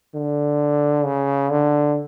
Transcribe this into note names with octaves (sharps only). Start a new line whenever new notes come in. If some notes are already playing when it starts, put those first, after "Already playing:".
D3
C#3
D3